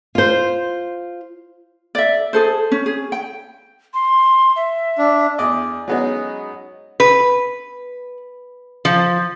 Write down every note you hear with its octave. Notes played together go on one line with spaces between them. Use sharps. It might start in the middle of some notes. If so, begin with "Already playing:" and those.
F4 C5
D5 E5
G#4 A4 C5
C#4
G#4
G5
C6
E5
D4
E2 D5 D#5
F#3 G#3 B3 C#4 D#4
B4
F3